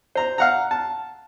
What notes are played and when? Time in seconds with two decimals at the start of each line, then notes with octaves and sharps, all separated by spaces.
0.15 C5 A#5
0.38 F5 F#5 A#5
0.71 A5